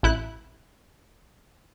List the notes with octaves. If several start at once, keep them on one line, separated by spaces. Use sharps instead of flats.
A1 E4 F#6